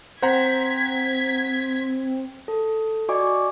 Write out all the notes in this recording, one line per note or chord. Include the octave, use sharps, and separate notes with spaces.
C4 C5 F#5 A#5 G#6 B6
A4
F#4 D5 D#5 G#5 C#6 D6